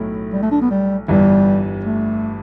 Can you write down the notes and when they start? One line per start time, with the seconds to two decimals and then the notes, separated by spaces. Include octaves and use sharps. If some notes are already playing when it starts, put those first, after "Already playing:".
Already playing: B1 A2 A3 E4
0.33 G3
0.43 A3
0.52 D4
0.62 B3
0.70 G3
1.08 G1 G2 E3 G3
1.85 A3